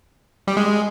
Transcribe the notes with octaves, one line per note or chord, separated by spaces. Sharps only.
G3
G#3